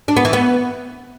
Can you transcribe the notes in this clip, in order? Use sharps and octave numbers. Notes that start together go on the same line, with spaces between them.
D4
B3
E3
B3